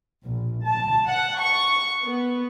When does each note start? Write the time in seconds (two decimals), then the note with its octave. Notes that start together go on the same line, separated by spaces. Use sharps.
0.24 A#1
0.65 A5
1.08 F#5
1.40 C#6
2.05 B3